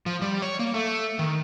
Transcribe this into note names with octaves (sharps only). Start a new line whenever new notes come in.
F3
G3
C#5
A#3
A3
D#3